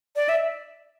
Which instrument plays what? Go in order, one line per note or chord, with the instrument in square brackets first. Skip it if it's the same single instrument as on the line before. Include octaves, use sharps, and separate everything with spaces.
[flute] D5
E5